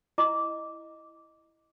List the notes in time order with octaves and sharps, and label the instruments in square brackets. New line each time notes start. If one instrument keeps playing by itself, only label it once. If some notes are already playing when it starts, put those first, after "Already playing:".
[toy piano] E4 D#5 A#5 D6